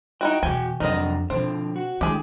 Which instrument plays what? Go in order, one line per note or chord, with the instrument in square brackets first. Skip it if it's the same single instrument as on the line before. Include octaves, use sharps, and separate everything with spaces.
[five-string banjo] D#4 E4 F#4 [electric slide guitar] G5
[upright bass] E2 B2 [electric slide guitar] F#4 G5 [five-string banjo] G#5
[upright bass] F2 [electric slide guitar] C3 F#3 D4 [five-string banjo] D#3 D#4 D#5
[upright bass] B2 [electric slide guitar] D3 F3 [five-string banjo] C4
[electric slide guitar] F#4
[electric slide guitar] D3 G#3 [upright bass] D#3 E4 [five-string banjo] G4 G#4